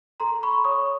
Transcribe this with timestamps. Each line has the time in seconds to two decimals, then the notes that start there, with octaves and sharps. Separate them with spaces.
0.20 A4 A#5 C6
0.43 B5 C#6
0.65 C#5 C#6 D#6